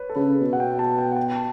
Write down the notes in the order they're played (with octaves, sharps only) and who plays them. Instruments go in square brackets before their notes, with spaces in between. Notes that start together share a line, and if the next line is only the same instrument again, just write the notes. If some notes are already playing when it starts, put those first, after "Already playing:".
Already playing: [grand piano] B4 C#5
A4
[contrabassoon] C#3 [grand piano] B4
[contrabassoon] B2
[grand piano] F#5
G5
A5
G5
F#5
G5
A5